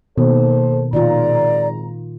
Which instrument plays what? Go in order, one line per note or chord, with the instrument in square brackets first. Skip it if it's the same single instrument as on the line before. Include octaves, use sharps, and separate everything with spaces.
[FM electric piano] B2 [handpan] D#3 [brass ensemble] A#3 A4 C5
[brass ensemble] G#1 A#5 [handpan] A#2 D#3 F4 [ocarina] D5